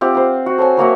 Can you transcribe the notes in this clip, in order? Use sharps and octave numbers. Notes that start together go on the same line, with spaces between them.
C4 F4 G4 F#5
C5 F#5
F#4
A4 C5 C#5 G#5
F#3 A#3 F#4 E5